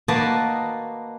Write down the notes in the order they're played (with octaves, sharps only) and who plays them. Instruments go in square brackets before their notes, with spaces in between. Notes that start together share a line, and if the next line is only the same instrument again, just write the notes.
[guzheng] A#3 F#4 B4 D5 D#5 A5